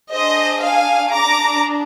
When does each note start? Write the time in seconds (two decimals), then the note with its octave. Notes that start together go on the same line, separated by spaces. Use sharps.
0.14 D4 G#4 C5 D#5
0.64 F5 G#5
1.15 D4 G#4 A#5 D6